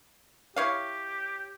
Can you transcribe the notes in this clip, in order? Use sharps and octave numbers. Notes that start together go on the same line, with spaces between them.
E4 G4 C#5 F5